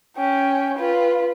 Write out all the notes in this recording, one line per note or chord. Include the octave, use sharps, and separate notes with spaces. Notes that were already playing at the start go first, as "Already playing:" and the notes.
C#4 G5
F4 B4